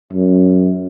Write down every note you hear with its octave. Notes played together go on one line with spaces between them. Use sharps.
F#2